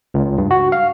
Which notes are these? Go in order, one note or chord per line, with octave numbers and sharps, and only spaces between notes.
C#2
G2
F#4
F5